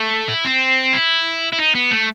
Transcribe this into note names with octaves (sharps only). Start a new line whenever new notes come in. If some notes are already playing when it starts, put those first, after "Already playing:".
Already playing: A3
E4
C4
E4
E4
D#4
B3
A3